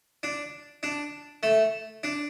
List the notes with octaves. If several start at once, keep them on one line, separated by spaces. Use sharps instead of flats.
D4
D4
A3
D4